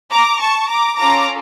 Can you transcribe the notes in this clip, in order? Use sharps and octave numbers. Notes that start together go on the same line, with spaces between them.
A#5 D6
A5 C#6
A#5 D6
C#4 F4 A4 A#5 D6